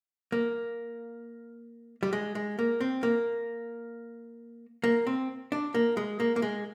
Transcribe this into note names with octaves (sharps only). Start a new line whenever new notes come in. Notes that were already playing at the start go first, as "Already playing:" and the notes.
A#3
G3
G#3
G#3
A#3
C4
A#3
A#3
C4
D4
A#3
G#3
A#3
A#3
G#3